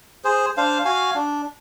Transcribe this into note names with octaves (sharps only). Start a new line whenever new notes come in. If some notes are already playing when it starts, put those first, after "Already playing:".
G#4 C5
D4 C5 F5
F#4 F5 G#5
D4